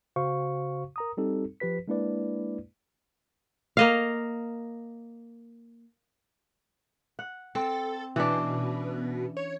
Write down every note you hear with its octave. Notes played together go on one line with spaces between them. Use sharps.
C#3 F#4 C5 F5 C#6
A#4 A#5 D#6
G3 C4 D#4 G4 A4
F3 G4 B4 B6
G#3 A#3 D4 E4 B4 D5
A#3 D#5 F5
F#5
C4 A4
B2 E3 C#4 D4
C#5